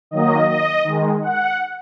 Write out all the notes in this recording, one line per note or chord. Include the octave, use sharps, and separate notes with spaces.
D#3 F#3 A#3 D#5
D#5
D#3 G#3
F#5